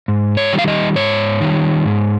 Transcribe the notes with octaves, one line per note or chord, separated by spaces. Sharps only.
G#2
C#5
D#3 G3
F5
D#5
G#2 C#5
D#3 G3
G#2